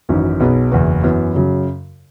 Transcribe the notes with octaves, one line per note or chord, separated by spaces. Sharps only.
G#1 F#2 E3 C#4
B1 B2 B3 G#4 B4
F#1 E2 E3 B3 F#4
F#2 E3 B3
F#2 C#3 F#3